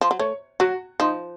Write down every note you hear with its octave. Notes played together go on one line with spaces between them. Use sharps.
F3
F#3
A3 C#5
F#3 F#4
F3 D#4